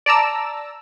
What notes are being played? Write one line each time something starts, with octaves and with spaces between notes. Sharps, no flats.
D5 A5 A#5 E6